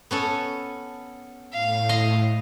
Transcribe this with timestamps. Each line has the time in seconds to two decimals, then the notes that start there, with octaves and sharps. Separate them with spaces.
0.11 B3 C#4 A4
1.53 A2 F5
1.89 D#5 C6